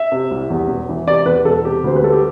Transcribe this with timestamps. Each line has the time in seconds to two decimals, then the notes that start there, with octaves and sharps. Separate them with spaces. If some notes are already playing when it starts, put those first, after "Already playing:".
Already playing: E5
0.12 C3
0.31 C2
0.50 E2
0.68 E1
0.89 E3
1.07 C3 D5
1.26 E2 B4
1.45 E1 A4
1.65 C3 G4
1.84 D2 C5
1.96 B4
2.02 G3 A4
2.12 G4